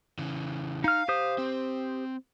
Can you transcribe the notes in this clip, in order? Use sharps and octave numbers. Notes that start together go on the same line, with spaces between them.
C#3 E3
D#4 F5 F6
G4 C5 D#6
C4